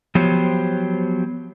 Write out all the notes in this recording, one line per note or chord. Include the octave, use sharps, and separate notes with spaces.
F3 F#3 B3 G4 C5 C#5